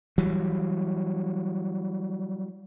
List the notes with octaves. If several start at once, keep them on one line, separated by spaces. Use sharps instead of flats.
E3 F#3 G3